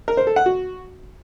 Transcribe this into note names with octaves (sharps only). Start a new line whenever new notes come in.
A#4
C5
A4
F#5
F#4